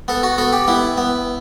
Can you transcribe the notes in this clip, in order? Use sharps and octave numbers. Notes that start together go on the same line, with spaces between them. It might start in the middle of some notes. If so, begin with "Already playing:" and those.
B3 A4
F#4
B3 A4
G4
B3 E4
B3